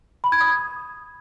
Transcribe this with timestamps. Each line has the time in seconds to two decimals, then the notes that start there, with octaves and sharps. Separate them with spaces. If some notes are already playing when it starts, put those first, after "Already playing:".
0.24 B5
0.32 G#6
0.41 D#6